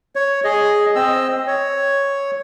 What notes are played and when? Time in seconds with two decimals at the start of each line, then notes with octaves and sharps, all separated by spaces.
0.16 C#5
0.44 G#4 D#5
0.96 C4 D#5 E6
1.47 C#5